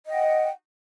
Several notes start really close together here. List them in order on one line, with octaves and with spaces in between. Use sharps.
D#5 G5 F#5